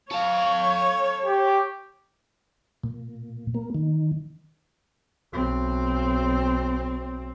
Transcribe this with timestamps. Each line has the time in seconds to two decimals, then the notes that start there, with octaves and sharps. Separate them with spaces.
0.11 A4 C#5 F5
1.25 G4
2.83 A#2
3.54 A#3
3.74 D#3
5.33 B1 C4